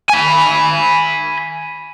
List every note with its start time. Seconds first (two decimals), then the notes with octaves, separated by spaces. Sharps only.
0.09 G#5 B5